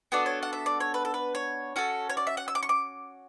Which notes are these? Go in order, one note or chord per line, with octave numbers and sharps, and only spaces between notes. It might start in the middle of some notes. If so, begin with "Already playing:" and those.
B3 D4 F#4 A4 D5
C#5
F#5
E5
D5
C#5
B4
A4
B4
C#5
C#4 F#4 A4
C#5
D5
E5
F#5
E6
D6
C#6
D6